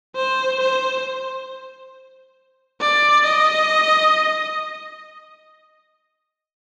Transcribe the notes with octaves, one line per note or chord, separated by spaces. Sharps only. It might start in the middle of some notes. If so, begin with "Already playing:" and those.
C5
C5
D5
D#5